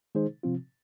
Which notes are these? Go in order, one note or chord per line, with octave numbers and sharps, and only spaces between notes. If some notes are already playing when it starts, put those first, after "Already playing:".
D#3 G#3 D#4 G#4 C5
C3 F3 C4 F4